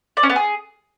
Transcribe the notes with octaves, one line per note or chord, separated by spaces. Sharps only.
D5
C#4
B3
G#4